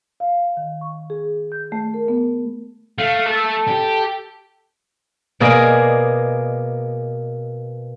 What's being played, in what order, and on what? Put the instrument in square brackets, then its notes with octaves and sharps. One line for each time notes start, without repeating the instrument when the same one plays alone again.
[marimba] F5
D#3
C#6
G#4
G6
A3
A#4
B3
[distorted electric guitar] A3 [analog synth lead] F5
[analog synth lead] A4
[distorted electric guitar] G4
[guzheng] B2 A#3 G#4 D5 D#5